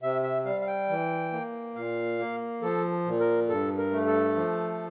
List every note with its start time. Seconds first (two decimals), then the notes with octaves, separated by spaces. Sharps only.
0.02 C3 E5
0.23 E5
0.45 G3 F5
0.61 F5
0.67 G5
0.89 E3
1.32 A#3
1.75 A#2 F5
2.19 A#3
2.62 F3 A4
3.05 A#2
3.20 A#4
3.49 G2 A4
3.78 A#4
3.92 A3
4.07 A4
4.35 F3